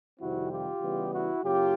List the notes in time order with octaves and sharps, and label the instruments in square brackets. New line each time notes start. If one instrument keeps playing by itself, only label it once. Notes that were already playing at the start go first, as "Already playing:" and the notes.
[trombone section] F2 C3 D#3 G3 C4 E4 F#4
F4 G4
C#3 E3 G3 B3
E4 F#4
F#2 C#3 F#3 A#3 F4 G4